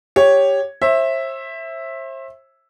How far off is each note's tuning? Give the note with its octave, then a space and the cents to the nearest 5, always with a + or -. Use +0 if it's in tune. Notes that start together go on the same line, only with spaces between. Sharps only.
G4 +5 C#5 +0
C5 +40 E5 +0